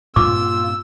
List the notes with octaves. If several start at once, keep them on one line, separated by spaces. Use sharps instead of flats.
G2 A#2 A#3 F4 D6 E6